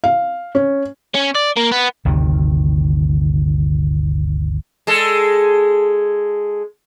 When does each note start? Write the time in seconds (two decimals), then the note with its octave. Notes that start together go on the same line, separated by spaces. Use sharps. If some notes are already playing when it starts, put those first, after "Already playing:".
0.04 F5
0.55 C#4
1.15 C#4
1.35 D5
1.57 A#3
1.72 B3
2.05 G1 D2 C3 D#3
4.87 G#3 A4